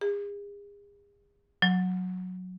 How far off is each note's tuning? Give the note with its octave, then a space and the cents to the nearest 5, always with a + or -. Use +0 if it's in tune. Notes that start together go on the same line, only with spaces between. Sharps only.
G#4 -40
F#3 -15